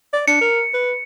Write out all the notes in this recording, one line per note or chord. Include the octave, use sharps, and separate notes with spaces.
D5
D4 C#7
A#4
B4